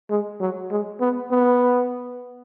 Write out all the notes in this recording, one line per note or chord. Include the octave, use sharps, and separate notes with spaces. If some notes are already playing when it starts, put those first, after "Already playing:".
G#3
F#3
G#3
B3
B3